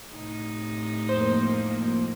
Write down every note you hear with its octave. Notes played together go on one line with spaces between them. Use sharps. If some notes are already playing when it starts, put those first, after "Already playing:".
A2 C3 D#4
F2 A#3 C5